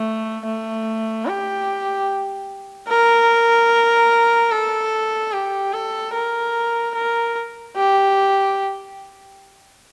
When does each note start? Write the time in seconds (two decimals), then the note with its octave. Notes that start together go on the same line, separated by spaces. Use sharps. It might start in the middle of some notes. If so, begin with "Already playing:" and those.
Already playing: A3
0.46 A3
1.26 G4
2.89 A#4
4.51 A4
5.33 G4
5.73 A4
6.14 A#4
6.95 A#4
7.76 G4